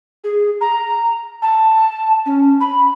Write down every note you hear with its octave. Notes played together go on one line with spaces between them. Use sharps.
G#4
A#5
A5
C#4
B5